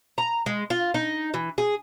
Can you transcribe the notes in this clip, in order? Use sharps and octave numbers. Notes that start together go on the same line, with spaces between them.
A#5
G#3
F4
D#4
E3
G#4